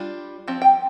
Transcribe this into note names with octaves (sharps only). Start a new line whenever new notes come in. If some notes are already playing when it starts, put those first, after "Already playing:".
Already playing: G3 D4 F4
F3 C4
G5